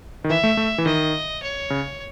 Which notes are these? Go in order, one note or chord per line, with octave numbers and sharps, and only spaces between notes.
D#3
E3 E5
A3
A3
E3
D#3 D#5
C#5
C#3